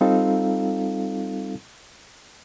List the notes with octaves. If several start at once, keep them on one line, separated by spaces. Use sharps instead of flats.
G3 C4 D#4 F4 A4 F5